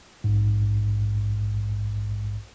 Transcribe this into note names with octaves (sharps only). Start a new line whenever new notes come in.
A#1 G#2